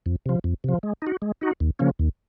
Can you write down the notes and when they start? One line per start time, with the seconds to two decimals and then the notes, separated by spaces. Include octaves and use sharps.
0.06 F2
0.26 C3 F3
0.44 F2
0.64 C3 F3
0.83 G#3
1.02 D#4 F#4
1.22 G#3
1.41 D#4 F#4
1.60 D#2
1.79 C#3 F3 A#3 C#4
1.99 D#2